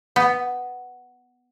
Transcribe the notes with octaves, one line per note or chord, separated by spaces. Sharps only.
B3